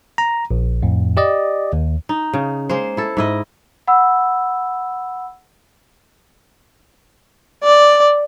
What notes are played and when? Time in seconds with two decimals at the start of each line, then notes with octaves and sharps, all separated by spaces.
0.18 A#5
0.51 A#1
0.83 F2 A2
1.17 G4 D5 D#5
1.73 D#2
2.09 D#4
2.33 C#3
2.69 G#3 A#3 C5
2.97 E4 A4
3.17 G#2 E4 D#5
3.88 F#5 B5 E6
7.64 D5